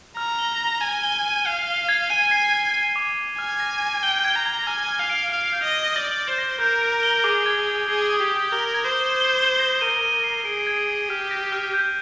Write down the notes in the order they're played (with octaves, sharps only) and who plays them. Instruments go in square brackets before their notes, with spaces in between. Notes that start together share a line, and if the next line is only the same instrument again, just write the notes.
[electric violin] A#5 [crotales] F6
[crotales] G7
G7
[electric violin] G#5 [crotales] G#6
[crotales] G7
D#7
[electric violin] F5 [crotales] G7
[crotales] G7
G#6
[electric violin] G#5 [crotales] D#7
[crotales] C7
C7
C7
D6
C7
[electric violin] G#5 [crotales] F6
[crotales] A#6
A#6
[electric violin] G5 [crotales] G7
[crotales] G#6
[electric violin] A#5
[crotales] G#6
[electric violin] G#5 [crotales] F6
[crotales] F6
[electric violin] F5
[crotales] D7
[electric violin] F5 [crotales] D7
[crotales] G6
[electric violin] D#5
[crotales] A#6
[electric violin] D5 [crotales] D6
[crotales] D6
[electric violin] C5
[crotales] A#6
[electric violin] A#4 [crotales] G6
[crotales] D7
G7
[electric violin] G#4 [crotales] D6
[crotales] G#6
F7
[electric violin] G#4 [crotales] G7
[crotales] D#6
[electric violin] G4
[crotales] D#6
[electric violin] A#4 [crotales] G7
[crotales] G#6
[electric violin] C5
[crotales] G7
G7
G7
A#6
[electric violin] A#4 [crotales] D#7
[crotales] D#7
C7
[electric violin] G#4 [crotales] D7
[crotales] G#6
G#6
[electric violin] G4 [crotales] F6
[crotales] A#6
F6
G6